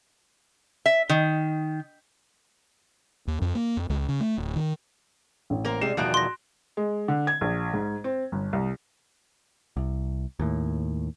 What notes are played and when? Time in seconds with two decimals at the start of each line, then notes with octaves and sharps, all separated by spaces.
0.86 E5
1.09 D#3
3.27 D#2
3.42 F2
3.55 A#3
3.77 F2
3.90 C#2
4.08 C#3
4.20 A3
4.38 D1
4.56 D#3
5.50 A1
5.65 A#3 A#4 C5
5.81 C3 G3 G#3 C7 E7
5.97 E2 B2 D#3 F3 G3 E4 F#6 D7
6.14 C6 A#6
6.77 G#3
7.08 D3
7.27 G#6
7.41 A#1
7.73 G#2
8.04 C4
8.32 G1
8.53 C2
9.77 C2
10.39 D#2 A2